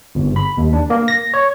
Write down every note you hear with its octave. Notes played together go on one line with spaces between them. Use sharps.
G1
B5
D#2
D4
A#3
A#6
C#5